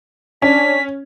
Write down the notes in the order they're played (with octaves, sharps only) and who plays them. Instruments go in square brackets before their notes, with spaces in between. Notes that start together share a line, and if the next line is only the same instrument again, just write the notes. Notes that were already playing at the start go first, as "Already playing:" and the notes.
[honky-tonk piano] C#4 [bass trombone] D4 [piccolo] B6